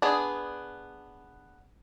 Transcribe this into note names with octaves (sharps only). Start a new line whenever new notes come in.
B3 D4 G#4